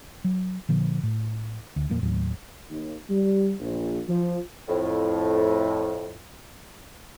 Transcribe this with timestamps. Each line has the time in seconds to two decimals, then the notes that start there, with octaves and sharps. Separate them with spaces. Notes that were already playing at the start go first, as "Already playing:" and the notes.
0.24 F#3
0.69 A#2 D3 F3
1.03 A2
1.76 D2
1.89 D#1 F2 A#2 A#3
2.03 D#2 A2 F#3
2.70 D#2
3.10 G3
3.60 A#1
4.08 F3
4.67 F2 A2